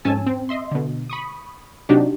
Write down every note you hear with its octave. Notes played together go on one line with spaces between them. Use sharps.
F2 G#2 C#4 G#5 A5 E6
C4
D#5 E5 C6
B2 D3
B5 C#6 D#6
C3 F#3 D4 D#4 F#4 G4